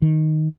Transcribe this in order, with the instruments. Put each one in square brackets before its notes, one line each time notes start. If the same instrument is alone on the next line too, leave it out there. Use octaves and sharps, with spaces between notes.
[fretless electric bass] D#3